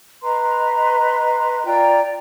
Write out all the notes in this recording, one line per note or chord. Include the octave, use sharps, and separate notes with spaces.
B4 D#5 A#5 C6
F4 D5 G5 A#5